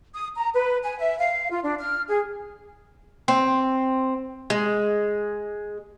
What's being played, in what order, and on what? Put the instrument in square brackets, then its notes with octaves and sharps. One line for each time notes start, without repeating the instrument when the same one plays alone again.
[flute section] D#6
A#5
B4
G#5
E5
F5
F4
D4
F6
G#4
[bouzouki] C4
G#3